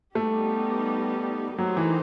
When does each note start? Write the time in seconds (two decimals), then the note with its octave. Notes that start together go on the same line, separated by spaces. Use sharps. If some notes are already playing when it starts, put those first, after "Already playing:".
0.15 G3 A3 B3 D#4 G4
1.58 D#3 F#3 A3 D#4 G4 C5
1.77 E3